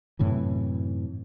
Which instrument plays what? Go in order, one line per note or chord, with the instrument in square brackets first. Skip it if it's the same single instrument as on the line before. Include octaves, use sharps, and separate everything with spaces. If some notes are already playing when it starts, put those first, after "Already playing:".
[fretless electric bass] F#2 A2 C3 E3